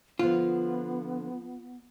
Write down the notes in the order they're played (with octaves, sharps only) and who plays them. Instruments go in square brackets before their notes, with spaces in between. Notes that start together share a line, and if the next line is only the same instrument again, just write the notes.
[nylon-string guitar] D3 F3 [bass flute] B3 [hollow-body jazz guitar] F4